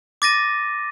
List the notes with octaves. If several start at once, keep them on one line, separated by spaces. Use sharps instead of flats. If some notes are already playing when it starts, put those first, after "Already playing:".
D6 A6 A#6 D#7